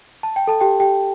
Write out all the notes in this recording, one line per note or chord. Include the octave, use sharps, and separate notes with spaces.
A5
G5
A4 A5
G4 G5
G4 G5